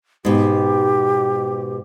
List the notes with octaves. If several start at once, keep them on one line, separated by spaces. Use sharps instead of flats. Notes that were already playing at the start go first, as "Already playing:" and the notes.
G#2 B2 G4